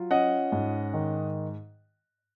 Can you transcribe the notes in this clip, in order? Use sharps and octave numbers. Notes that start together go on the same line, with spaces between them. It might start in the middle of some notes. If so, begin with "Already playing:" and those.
Already playing: F#3 F4
C#4 D#5 F#5
G#2
D#3